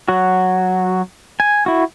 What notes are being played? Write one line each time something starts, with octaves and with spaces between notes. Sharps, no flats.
F#3 F#4
G#5
E4 F#4